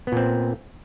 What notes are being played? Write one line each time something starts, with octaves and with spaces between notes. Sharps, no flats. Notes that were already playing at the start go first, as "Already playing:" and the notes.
A#2 B3 C4